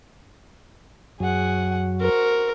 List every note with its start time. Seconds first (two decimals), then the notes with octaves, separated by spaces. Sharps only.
1.20 F#2 F#3 G#4 F#5
2.00 F#4 A#4 C5